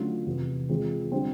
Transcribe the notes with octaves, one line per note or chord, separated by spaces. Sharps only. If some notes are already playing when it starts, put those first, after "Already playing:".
Already playing: D3 F#3 A3 C#4 F4
E2 C3 E3
E3 G#3 C4 F4 G#4
D3 G3 C4